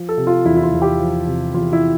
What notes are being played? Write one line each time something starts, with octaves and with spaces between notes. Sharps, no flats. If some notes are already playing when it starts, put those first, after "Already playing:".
Already playing: F3
A4
C3
F4
E2 E4
E4
F4
E2
G4
F3
C3
E2 F4
E4